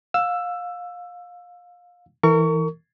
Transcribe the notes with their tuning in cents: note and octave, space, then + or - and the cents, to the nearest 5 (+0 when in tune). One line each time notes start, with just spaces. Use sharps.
F5 +25 E6 +10
E3 -15 A#4 -30 C#6 +25